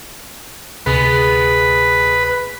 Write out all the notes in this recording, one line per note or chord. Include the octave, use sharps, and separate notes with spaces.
D2 C3 G#3 B3 G#4 B4